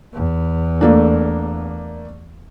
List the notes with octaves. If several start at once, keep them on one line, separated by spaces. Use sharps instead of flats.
E2
A3 A#3 D4